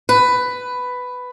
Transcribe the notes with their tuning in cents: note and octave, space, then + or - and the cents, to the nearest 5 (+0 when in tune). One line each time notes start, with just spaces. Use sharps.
B4 +10